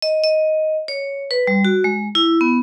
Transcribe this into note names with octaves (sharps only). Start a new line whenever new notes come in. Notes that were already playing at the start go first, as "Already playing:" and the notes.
D#5
D#5
C#5
B4
G3
F#4
G#3
E4
B3